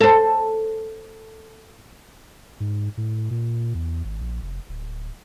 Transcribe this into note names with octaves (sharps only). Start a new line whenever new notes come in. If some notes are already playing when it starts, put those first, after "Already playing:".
A4 C5
G#2
A2
A#2
E2
G#1
A#1
F1
D1